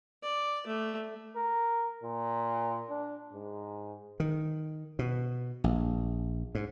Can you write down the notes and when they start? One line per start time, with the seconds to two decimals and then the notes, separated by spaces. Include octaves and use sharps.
0.23 D5
0.67 A3
1.36 A#4
2.03 A#2
2.90 D4
3.33 G#2
4.20 D#3
4.99 B2
5.64 A#1
6.55 G#2